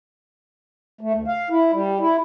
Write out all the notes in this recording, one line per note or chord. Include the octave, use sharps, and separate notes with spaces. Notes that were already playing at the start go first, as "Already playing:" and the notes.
A3
D2
F5
E4
G3
E4